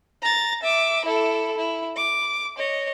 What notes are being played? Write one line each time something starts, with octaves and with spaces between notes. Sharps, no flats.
A#5 A6
E5 D6
E4 A4
E4
D6
C#5 D#5